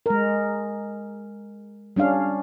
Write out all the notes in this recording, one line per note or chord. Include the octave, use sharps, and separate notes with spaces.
G#3 A#4
G3 C#4 D4 F5